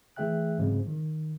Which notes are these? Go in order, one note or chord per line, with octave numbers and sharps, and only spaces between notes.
E3 A3 G#4 E5 G5 F#6
G#2 C#3 F3 F#3 G#3 C4
D#3